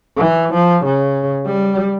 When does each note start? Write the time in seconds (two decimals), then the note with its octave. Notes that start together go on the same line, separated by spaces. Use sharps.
0.18 E3
0.54 F3
0.85 C#3
1.46 G3